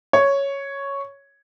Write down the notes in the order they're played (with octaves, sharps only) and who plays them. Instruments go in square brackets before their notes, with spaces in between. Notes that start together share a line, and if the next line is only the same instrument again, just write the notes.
[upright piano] C#5